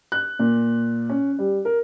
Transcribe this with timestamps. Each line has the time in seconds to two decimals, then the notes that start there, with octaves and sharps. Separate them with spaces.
0.12 F#6
0.39 A#2
1.09 C#4
1.39 G3
1.65 A#4